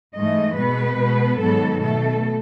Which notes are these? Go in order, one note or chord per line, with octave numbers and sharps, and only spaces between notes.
G#2 E3 A3 D#5
B2 G#3 B3 B4
B2 G#3 B3
G#2 D#3 F#3 B3 A4
B2 A3 A4